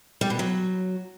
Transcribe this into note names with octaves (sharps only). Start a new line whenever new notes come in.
G3
B2
F#3